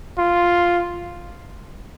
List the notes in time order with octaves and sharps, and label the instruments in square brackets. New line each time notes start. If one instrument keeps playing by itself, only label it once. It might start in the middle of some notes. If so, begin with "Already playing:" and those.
[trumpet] F4